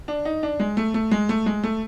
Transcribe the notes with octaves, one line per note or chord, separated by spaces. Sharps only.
D4
D#4
D4
G#3
A3
A3
G#3
A3
G#3
A3